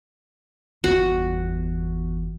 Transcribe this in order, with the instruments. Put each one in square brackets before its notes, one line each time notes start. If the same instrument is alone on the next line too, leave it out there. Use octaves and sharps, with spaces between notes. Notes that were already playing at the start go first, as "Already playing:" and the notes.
[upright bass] G1 E2 [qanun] F#4